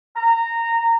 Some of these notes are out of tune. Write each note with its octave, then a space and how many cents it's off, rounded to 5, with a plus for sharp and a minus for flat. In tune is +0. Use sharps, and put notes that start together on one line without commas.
A#5 -15